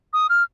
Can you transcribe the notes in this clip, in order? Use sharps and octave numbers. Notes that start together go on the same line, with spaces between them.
D#6
F6